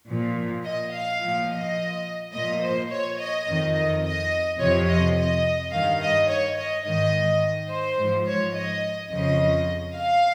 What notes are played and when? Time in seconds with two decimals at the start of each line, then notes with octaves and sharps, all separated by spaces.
0.09 A#2 F3
0.65 D#5
0.92 F5
1.21 A#2 F3
1.49 D#5
2.33 A#2 F3 D#5
2.62 C5
2.91 C#5
3.18 D#5
3.47 F2 D#3
3.75 D#5
4.04 D#5
4.60 F2 C3 F3 C#5
4.87 D#5
5.16 D#5
5.72 G2 D#3 F5
6.00 D#5
6.29 C#5
6.57 D#5
6.85 G#2 D#3 D#5
7.70 C5
7.97 G#2 F3
8.27 C#5
8.54 D#5
9.10 F2 C#3 F3 D#5
9.95 F5